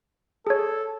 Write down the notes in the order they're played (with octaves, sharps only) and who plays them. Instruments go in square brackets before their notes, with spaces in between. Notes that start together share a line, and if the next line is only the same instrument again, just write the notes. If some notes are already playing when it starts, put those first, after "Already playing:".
[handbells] G#4 C#5 [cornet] A4